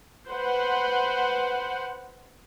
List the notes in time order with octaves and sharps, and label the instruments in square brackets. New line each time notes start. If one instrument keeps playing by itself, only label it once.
[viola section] B4 C5 F#5